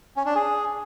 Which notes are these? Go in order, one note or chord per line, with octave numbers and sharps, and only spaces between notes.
C#4
D4
G#4